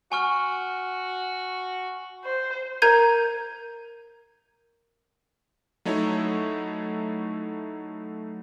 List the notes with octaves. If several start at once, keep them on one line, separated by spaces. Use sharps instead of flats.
F#4 G#5 C#6 F6
C5
A#4 A#5 G6 G#6 D#7
F#3 A3 D#4 E4 C#5